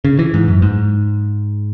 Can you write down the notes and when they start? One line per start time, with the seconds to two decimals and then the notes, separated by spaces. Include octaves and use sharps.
0.04 C#3
0.19 E3
0.34 G#2
0.48 F#2
0.62 G#2